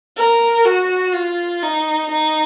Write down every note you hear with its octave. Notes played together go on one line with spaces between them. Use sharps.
A#4
F#4
F4
D#4
D#4